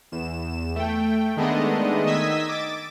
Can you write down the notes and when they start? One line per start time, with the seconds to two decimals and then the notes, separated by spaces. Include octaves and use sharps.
0.12 E2 E7
0.76 A3 G5
1.37 D#3 G#3 A3 B3 D4 D#5
2.05 D#3 D#5 D#6 E6 G#6 B6
2.49 D6 A6